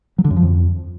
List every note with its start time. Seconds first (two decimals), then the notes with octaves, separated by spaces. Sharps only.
0.18 F#3
0.24 D3
0.31 F#2
0.37 F3
0.43 F2